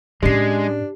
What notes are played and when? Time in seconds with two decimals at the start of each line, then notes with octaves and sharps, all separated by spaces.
0.23 A2 G#3 C#4 D4 G4 C7